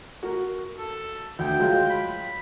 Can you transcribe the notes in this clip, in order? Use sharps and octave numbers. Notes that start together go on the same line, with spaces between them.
F#4 A#4
A4
D2 G5
F#3 G#3 F4
B5